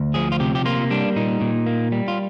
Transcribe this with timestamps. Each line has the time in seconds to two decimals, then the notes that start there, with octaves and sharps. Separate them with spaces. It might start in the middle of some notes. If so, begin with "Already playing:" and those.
Already playing: D2
0.14 F3 G#4
0.32 F4
0.40 C3 G4
0.55 G4
0.65 A#3 F4
0.90 G3 D4
1.16 A#2 D#4
1.41 A#2
1.66 A#3
1.92 G3
2.08 F4